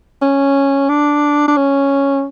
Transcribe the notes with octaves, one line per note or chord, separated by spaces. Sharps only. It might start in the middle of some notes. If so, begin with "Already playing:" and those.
C#4
D4
D4
C#4